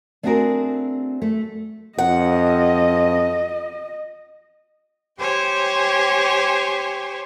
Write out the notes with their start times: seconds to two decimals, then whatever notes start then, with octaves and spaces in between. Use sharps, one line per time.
0.23 A3 C4 D4 F#4 G#4 A#4
1.22 A3
1.98 F2 D#5 F#5
5.18 G4 C5 C#5 G5 G#5